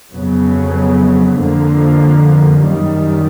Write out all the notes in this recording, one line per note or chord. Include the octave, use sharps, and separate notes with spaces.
F2 C#3 F#3 B3
F2 D3 F3 A#3
F#2 D#3 G3